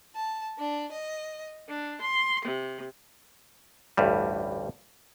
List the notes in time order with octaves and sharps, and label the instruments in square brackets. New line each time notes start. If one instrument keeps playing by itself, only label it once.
[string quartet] A5
D4
D#5
D4
C6
C3
[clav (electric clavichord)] A1 D2 G2 G3